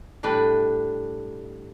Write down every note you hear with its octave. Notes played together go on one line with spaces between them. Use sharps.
A2 G3 D4 B4